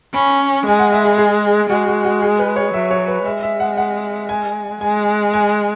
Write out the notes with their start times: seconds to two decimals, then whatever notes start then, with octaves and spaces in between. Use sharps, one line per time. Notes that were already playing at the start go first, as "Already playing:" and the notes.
0.14 C#4 B5
0.66 G#3 G#5
0.79 F#5
0.92 E5
1.05 G#4
1.18 G#4
1.69 G#3 F#4
1.87 F#4
2.04 F#4
2.21 G#4
2.39 B4
2.56 C#5
2.74 F#3 E5
2.91 C#5
3.08 B4
3.26 G#3 E5
3.43 E5
3.60 F#5
3.77 F#5
4.29 G#5
4.81 G#3 G#5
5.33 G#5